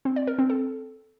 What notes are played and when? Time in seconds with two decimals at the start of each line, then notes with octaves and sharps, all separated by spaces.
0.05 C4
0.16 D5
0.27 A#4
0.39 C4
0.50 A4